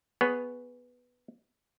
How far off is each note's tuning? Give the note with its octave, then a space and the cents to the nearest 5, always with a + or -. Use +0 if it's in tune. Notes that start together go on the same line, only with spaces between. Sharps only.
B3 +0 G#4 +0 C#5 +0